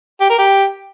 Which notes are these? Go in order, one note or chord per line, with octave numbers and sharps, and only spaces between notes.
G4
A#4
G4